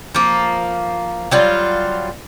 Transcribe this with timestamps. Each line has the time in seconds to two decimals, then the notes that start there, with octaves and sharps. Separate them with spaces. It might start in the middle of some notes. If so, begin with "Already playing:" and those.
0.15 F3 A#3
1.31 F#3 G3 F4